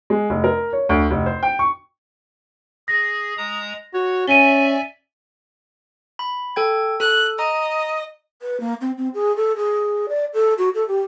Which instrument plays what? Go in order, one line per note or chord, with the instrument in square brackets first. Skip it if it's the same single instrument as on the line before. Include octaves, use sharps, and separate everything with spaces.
[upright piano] G#3
F1
A#4
C#5
D2
F1
C5
G5
C#6
[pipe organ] G#4 [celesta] A#6
[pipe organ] G#3 A#5 D#6
[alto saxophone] F#4 [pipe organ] C#5
[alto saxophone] C#4 [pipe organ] D5 E5 G#5 [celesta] D#7 G7
[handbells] B5
A4 G5 G#6
[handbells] A4 [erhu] F#6
[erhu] D#5 [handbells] A#5
[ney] B4
A#3
C4
C4
G#4
A4
G#4
D5
A4
F#4
A4
G4